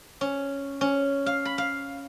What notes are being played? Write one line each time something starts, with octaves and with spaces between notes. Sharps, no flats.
C#4
C#4
F5
B5
F5